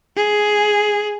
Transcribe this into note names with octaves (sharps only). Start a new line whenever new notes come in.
G#4